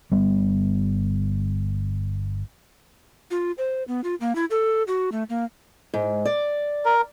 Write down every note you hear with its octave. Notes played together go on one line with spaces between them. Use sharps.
G1 G3 B3
F4
C5
B3
F4
A#3
E4
A4
F#4
A3
A#3
G#2
D5
A#4